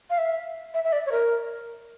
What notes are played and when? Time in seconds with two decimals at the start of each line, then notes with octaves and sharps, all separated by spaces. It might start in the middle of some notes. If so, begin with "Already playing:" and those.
0.10 F5
0.18 E5
0.74 E5
0.84 E5
0.92 D5
1.06 C#5
1.12 A#4